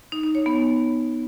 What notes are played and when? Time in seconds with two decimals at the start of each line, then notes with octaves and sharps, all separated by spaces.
0.12 D#4
0.23 D#4
0.35 C#5
0.46 B3